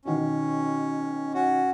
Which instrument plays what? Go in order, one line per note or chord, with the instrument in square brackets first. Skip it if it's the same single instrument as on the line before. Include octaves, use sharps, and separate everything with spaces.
[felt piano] B2 D#3 [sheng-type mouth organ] C#4
[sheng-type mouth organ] C#4 F#4